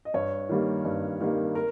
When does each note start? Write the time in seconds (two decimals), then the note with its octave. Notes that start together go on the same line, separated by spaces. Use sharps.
0.05 D#5
0.14 G2 C#5
0.49 D#3 G3 A#3
0.85 G2
1.21 D#3 G3 A#3
1.55 A#4